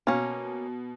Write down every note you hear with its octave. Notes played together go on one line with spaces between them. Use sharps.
B2 A#3 C#4